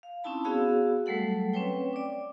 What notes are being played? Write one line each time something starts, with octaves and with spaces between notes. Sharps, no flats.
F5
C4 C#4 D#4 E4 A5 B5
B3 F#4 G#4 C#5 F5 E6
F#3 G3 A3 A4 F#5
C4 C#4 B4 C#5 G5
D5 D6